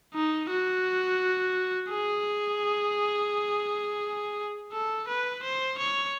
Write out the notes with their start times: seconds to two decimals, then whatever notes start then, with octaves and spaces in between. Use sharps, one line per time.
0.14 D#4
0.50 F#4
1.90 G#4
4.72 A4
5.08 B4
5.43 C5
5.78 C#5